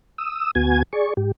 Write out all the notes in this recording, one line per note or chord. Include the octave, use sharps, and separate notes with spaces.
D#6 E6
D2 B3 F#4 G#5 G#6
G#4 D5 C#6
G#2 G4